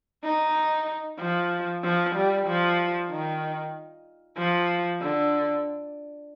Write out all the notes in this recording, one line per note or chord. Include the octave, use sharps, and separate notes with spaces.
D#4
F3
F3
G3
F3
D#3
F3
D3